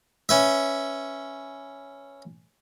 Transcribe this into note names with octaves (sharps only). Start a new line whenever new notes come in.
C#4 B4 E5